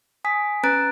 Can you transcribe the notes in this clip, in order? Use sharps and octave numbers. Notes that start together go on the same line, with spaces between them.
G#5 D#6 B6
C#4 B4 A#5 F#6 A6 D7